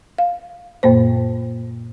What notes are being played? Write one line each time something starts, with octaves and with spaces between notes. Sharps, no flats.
F5
F#2 A#2 A#3 C5